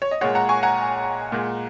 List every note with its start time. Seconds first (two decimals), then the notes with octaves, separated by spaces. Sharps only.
0.02 C#5
0.11 D#5
0.21 A#2 G#3 C#5 F#5
0.35 F#5 A#5
0.49 G#5 C#6
0.63 F#5 A#5
1.32 A#2 G#3